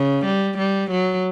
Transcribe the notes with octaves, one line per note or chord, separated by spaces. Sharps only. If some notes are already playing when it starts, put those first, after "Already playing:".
Already playing: C#3
G3
G3
F#3